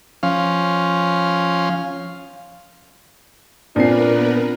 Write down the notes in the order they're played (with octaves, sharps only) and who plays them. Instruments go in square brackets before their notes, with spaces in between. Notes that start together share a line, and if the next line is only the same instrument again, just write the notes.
[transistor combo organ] F3 C#4 F5
[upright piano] A#2 C7 [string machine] B3 A#4 B4 [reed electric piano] C4 F4 [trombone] D4